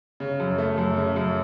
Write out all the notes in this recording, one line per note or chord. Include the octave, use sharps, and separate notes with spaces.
C#3
F#2
A3
F#2
C#3
F#2